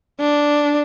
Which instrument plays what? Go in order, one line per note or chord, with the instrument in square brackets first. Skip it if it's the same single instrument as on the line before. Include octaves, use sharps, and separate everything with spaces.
[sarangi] D4